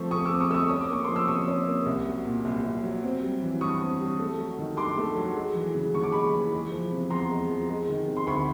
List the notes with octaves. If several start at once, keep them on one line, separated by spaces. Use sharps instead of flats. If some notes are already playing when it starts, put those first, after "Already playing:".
Already playing: F3 A3 C4 C#6
C3 C#6 D#6
D6 E6
C4
C#6 D#6
A3 C#6 D#6 E6
C#4 D#6
D6
A#3 C#6
C6 D6
F3
E6
C3 C#6 D#6
C#4
A#3
C2
F#3
A#2
C2
C2
F#3
C4
G3
E3
G2 C#6 D#6
C4
G3
A3
F#3
D#3
G2 C6 D6
A3
F#3
G#3
E3
C#3
D#2 C#6
D6
G#3 B5 C#6
E3
G#3
F3
C3
E2 A#5 C6
G#3
F3
G#3
D#3
C3
C6
D2 B5 C#6